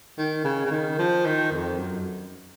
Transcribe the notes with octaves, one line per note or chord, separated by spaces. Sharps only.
D#3
C#3
C#3
D#3
F3
D#3
F2
F#2